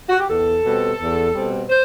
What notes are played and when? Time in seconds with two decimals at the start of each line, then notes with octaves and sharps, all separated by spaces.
0.10 F#4
0.20 G4
0.29 E2 A4
0.64 B2 G3 C4
1.00 E2
1.34 B2 G3 C4
1.70 C5